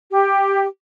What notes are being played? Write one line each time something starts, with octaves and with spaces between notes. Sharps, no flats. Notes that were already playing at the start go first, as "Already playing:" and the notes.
G4